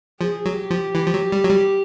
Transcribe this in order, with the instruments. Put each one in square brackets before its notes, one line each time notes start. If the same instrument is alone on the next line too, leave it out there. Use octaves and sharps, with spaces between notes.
[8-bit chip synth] F3 [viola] G#4
[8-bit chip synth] F#3
[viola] G4
[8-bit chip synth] F3
E3
F3
F#3
G3
F#3
G3